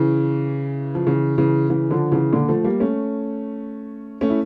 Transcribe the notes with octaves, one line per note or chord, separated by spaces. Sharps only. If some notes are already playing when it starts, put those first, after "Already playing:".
Already playing: C#3 E3
F3
C#3 E3
C#3 E3
C#3 E3
D3 F3
C#3 E3
A#2 D3
F3 A3
G3 A#3
A3 C#4
A3 C#4
E4